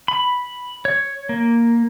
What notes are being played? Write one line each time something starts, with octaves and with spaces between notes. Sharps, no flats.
B5
C#5
A#3